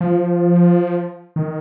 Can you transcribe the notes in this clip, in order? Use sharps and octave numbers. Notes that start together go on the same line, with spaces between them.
F3
D#3